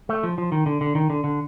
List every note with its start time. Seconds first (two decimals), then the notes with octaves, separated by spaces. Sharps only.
0.09 A3
0.23 F3
0.38 F3
0.52 D#3
0.66 D3
0.81 D3
0.95 D#3
1.10 D3
1.24 D3